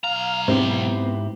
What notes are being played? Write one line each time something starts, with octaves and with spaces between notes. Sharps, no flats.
B1 F5 A#5
G#2 B3 C4 E4 G4